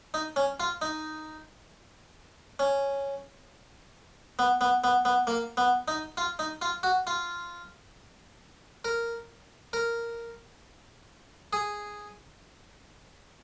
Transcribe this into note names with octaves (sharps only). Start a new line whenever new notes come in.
D#4
C#4
F4
D#4
C#4
B3
B3
B3
B3
A#3
B3
D#4
F4
D#4
F4
F#4
F4
A#4
A#4
G#4